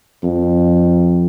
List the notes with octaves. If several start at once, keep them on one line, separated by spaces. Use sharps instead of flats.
F2